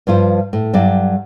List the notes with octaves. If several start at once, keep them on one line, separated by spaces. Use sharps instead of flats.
G2 F3 F4 C5
A2
G2 F#3 G4 D5